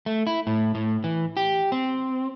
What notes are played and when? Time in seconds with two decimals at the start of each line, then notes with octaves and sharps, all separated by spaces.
0.06 A3
0.27 E4
0.47 A2
0.75 A2
1.04 E3
1.37 G4
1.72 C4